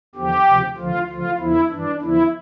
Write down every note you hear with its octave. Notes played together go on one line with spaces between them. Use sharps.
E2 D3 F3 G4
D2 C3 F3
D2 D3 F3 F4
D2 D3 F3 F4
E2 D3 F3 E4
G2 E3 D4
E2 D3 F3 E4